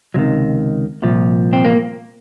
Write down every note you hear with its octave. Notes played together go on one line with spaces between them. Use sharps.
C#2 C3 D#3 F#3
C2 A#2 F3
C4
A#3